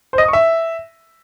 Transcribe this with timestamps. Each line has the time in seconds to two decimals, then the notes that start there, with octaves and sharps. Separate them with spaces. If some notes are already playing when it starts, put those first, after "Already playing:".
0.13 C5
0.18 D#5
0.23 D#6
0.28 C#6
0.33 E5